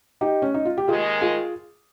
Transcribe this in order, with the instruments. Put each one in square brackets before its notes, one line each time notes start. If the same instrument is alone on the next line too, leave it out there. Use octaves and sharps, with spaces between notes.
[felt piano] D#4 G4
C#4
D#4
F4
G4
[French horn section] D#2 D#3 G#3 [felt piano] F4 G#4
[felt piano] F4 G#4